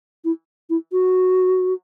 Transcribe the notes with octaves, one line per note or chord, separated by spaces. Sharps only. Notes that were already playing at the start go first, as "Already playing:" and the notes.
E4
E4
F#4